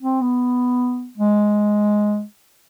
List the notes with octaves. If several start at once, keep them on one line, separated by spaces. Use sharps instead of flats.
C4
B3
G#3